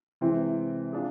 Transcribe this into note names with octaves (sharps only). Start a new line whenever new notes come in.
C3 E3 G#3 C4
D4 F4 G#4